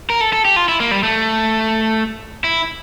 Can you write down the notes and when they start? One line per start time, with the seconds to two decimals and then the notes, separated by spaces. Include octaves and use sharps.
0.10 A#4
0.21 A4
0.33 A4
0.45 G4
0.56 F4
0.68 E4
0.80 A#3
0.91 G3
1.03 A3
2.44 E4